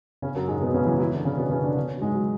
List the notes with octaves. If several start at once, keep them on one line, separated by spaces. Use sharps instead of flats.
C#3 C#4
F#2 F#3
G#2 G#3
B2 B3
C#3 C#4
E3 E4
E3 E4
D3 D4
C#3 C#4
B2 B3
C#3 C#4
D3 D4
C#3 C#4
F#3
G#2 G#3
F#3